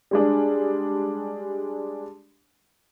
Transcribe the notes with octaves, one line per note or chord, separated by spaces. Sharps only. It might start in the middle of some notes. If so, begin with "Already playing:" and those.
G3 G#3 D4